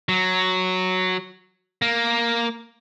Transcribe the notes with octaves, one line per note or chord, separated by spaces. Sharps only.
F#3
A#3